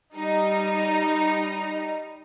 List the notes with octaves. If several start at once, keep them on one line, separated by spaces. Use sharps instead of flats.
G3 D#4